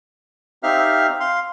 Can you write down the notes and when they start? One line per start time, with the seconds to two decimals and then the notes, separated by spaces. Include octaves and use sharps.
0.63 C4 D#4 G4 E5 F5 F6
1.20 F5 C6